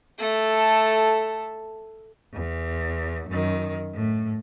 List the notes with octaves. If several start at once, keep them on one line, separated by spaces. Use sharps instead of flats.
A3 A4
E2
F#2 D#3
A2